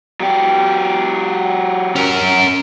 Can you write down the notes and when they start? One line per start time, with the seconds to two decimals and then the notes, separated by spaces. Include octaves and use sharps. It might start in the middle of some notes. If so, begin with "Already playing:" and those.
0.20 F#3 G4
1.96 C#4 A#4